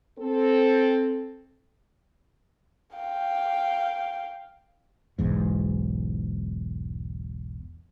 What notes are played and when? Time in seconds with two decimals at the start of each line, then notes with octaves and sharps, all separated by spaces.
0.20 C4 A4
2.96 F5 G5
5.19 E1 B1 E2 G#2